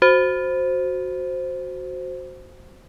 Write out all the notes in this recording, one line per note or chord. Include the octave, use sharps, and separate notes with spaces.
F#4 C5